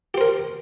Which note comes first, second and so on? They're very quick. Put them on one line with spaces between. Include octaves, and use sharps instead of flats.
G4 C5 A#4